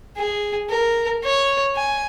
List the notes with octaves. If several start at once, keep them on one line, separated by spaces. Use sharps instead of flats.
G#4
A#4
C#5
G#5